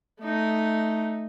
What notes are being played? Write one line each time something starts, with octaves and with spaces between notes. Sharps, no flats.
A3 D#4